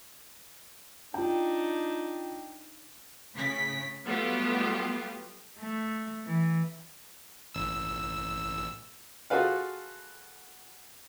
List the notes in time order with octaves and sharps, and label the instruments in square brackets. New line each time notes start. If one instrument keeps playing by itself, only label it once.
[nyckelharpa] D4 D#4 [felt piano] F4 G5
[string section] A2 C#3 B6
F#3 G3 A3 B3 F4 G4
[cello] A3
E3
[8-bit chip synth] A1 E6
[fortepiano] F4 F#4 G#4 A4 B4 F5